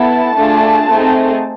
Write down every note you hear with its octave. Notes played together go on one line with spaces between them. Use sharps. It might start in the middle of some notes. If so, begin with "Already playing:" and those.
Already playing: B3 E4 A4 A5
A3 D4 F4 G#4
A3 C4 D#4 G#4